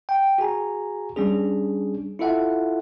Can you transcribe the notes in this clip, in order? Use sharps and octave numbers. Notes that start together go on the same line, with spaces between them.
G5
F#4 G#4 G#5 A#5
G3 C#4 D4 G#4
E4 F4 A4 E5 F#5